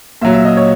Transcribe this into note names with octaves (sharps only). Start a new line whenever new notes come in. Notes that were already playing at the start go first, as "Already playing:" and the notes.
A#2 F#3 E5
E5
D#5
C#5